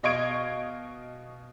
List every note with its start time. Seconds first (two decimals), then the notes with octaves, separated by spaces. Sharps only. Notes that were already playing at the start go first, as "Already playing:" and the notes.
0.03 B2 D#5 F5 C#6 G#6 D7